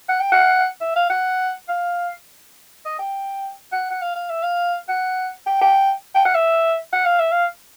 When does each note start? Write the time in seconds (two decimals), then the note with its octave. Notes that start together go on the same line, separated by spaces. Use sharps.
0.09 F#5
0.20 G5
0.32 F#5
0.81 E5
0.96 F5
1.10 F#5
1.69 F5
2.85 D#5
2.99 G5
3.72 F#5
3.91 F#5
4.01 F5
4.15 F5
4.30 E5
4.43 F5
4.88 F#5
5.46 G5
5.61 G5
6.15 G5
6.25 F#5
6.35 E5
6.93 F#5
7.06 F5
7.19 E5
7.32 F5